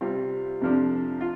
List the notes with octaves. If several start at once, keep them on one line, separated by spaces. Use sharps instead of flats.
C3 G3 C4 F4
F2 C3 F3 D4
F4